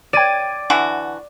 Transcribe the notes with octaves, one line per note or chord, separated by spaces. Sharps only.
D5 G5 G#6 D#7
D3 E3 F#4